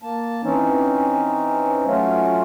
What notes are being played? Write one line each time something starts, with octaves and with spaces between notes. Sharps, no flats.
A#3 A5
E3 C4 C#4 D#4
F#3 A3 C#4 F4